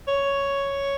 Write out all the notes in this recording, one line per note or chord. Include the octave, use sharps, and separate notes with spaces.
C#5